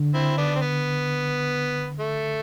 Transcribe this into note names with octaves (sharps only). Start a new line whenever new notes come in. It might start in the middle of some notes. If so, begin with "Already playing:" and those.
Already playing: D3
C4 E4
B3 D4
C4
B3
A3